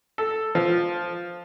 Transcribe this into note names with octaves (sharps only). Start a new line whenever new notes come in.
A4
F3